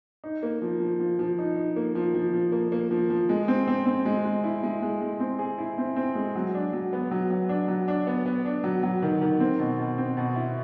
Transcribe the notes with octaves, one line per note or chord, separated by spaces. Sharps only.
D#4
A#3
F3
F3
F3
F3
D#4
D#4
A#3
F3
F3
F3
A#3
A#3
F3
F3
G#3
C4
C4
C4
G#3
G#3
E4
G#3
G#3
G#3
C4
G#4
E4
C4
C4
G#3
F#3
D4
F#3
B3
F#3
F#3
D4
F#3
D4
B3
B3
D4
F#3
F#3
D#3
D#3
C4
B2
B2
C4
B2
E4